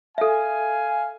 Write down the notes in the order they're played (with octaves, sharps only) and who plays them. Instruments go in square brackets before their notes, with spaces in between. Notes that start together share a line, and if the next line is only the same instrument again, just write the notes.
[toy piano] A4 E5 [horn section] F5 G#5